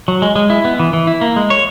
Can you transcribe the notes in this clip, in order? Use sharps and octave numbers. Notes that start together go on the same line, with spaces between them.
F#3
G#3
G#3
E4
B3
E3
E3
E4
A#3
G#3
C#5